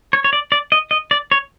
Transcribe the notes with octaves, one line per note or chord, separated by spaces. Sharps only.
C#5
C#5
D5
D5
D#5
D#5
D5
C#5